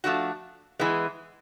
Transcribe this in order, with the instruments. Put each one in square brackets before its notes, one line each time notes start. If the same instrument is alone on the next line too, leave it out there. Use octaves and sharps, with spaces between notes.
[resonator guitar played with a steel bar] F3 A3 D4 F#4
E3 G#3 B3